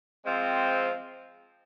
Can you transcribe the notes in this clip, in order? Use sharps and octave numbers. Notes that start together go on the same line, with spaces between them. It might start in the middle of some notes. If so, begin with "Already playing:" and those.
F3 G#3 C4